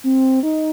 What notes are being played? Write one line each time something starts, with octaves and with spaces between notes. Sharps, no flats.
C4
D#4